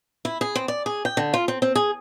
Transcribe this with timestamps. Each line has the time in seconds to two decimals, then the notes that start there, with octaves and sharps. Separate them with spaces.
0.25 E4
0.41 G#4
0.55 C4
0.68 D5
0.86 G#4
1.05 G5
1.17 D3
1.34 F4
1.48 C4
1.62 C4
1.75 G#4